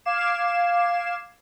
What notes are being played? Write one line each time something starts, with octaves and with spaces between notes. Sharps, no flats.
F5 D6 G#6 C7 E7